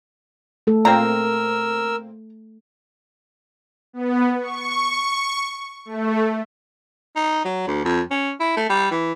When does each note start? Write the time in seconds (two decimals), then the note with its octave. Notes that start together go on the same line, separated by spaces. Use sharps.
0.67 A3 A4
0.85 A#2 A#3 C4 A#4 A#5 E6
3.93 B3
4.40 C#6
5.85 A3
7.16 D#4
7.45 F#3
7.67 D2
7.85 F2
8.11 C#4
8.40 E4
8.57 A3
8.69 G3
8.91 E3